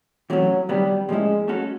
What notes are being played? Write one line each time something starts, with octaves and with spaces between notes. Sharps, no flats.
C3 E3 F#3 A3 C#4
C3 D#3 F#3 G3 B3
A2 F3 G#3 A#3 C#4 E4
A3 C#4 F#4 A4